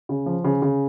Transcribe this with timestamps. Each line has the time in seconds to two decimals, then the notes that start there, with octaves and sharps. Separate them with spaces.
0.09 C#3
0.26 F3
0.44 C#3
0.62 C#3